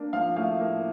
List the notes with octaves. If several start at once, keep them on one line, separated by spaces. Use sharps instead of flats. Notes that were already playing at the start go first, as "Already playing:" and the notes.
Already playing: A#3 D4
F3 F5
A2 F5
A#3